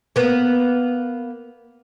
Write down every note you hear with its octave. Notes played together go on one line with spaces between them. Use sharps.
A#3 B3